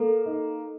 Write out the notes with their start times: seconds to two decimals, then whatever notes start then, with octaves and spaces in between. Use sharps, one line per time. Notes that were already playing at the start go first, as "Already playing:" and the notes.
Already playing: A#3 A4
0.26 D#4